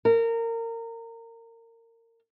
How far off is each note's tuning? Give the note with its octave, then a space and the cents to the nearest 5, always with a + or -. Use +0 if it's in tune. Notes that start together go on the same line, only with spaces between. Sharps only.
A#4 -25